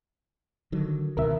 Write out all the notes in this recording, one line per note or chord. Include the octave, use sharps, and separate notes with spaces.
D3 D#3 F#3
C#2 B2 D#3 A#4 E5